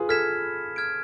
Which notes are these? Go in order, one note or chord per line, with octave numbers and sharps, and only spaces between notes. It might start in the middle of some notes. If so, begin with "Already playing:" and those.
Already playing: F4 G#4 B4
A4 F6 G#6 B6 E7
F6 G#6 D7